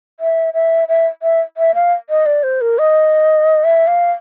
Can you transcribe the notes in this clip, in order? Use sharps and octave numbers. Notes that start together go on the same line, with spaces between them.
E5
E5
E5
E5
E5
F5
D#5
D5
C5
A#4
D#5
E5
F5